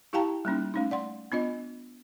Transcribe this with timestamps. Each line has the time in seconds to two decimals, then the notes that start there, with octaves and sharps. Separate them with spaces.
0.13 E4 G4 F5 G5 A5 A#5
0.45 G3 A#3 C#4 D#4
0.74 A3 C#4 D#4
0.91 D5 F#5 C6
1.32 B3 D4 F4 D#5